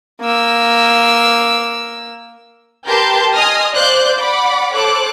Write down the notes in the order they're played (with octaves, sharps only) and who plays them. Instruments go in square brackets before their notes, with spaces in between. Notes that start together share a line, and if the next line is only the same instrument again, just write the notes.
[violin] A#3 E6
[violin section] G4 A#4 B4 A5 C6 G6
D#5 G#5 C6 D#6 F6
C5 D5 F5 F#6 G6
D5 F#5 B5 D6
A4 C5 C#5 D6 F#6